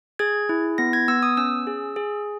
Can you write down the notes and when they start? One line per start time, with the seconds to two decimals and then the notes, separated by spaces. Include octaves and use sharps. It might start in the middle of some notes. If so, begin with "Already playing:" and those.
0.19 G#4 G#6
0.49 E4
0.78 B3 A#6
0.93 G#6
1.08 B3 E6
1.23 D#6
1.37 C#4 E6
1.67 G#4
1.96 G#4